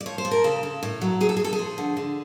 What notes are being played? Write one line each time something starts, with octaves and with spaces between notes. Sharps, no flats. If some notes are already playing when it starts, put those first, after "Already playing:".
D5
F3 C#5
C5
F3
A#4
C#3 A4
C#3
A2
F#3
A2 G#4
A4
G#4
A2 A4
G#4
F3
D3
D3